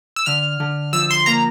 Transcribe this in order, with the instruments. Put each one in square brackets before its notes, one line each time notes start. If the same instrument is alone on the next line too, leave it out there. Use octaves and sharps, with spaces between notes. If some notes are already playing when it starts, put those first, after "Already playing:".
[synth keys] E6
[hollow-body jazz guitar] D3 [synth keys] F6
[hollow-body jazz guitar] D3
[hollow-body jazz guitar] F3 [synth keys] E6
[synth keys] C6
[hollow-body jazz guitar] A#3 [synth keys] A#5